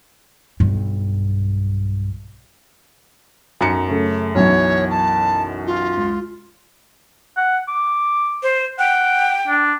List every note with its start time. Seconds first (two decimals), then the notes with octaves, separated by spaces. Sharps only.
0.60 B1 G2
3.61 B1 F#2 A#5 C#7
3.88 C#3 A3
4.35 B1 B2 E3 C#5
4.91 A5
5.66 F4
5.97 C#2
7.37 F#5
7.68 D6
8.43 C5
8.79 F#5 G5
9.48 D4